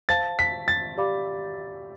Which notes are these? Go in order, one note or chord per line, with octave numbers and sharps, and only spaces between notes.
C5 F5 A5 A6
B6
A6
G4 D5 F5 B5 D6